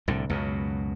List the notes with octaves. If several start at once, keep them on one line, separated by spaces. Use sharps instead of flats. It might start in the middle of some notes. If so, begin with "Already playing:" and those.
C2 A2 D3
C#2 F#2 B2